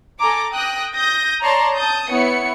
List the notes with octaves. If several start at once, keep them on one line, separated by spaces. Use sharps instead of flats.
A4 G#5 A#5 D6
G5 D#6 F#6 A#6
D#6 G6 A#6
C#5 D5 A5 A#5 C6
A5 D#6 G6
B3 E4 C#5 C#7